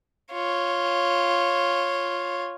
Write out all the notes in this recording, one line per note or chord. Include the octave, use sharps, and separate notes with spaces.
F4 C#5